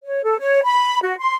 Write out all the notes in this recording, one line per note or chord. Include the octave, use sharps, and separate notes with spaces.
C#5
A4
C#5
B5
F#4
C6